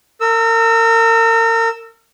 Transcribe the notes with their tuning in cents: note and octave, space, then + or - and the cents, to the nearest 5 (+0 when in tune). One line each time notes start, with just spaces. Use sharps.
A#4 -35 E6 +0